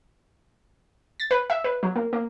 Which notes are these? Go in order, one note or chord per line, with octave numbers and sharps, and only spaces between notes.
A6
B4
E5
B4
F#3
A#3
A#3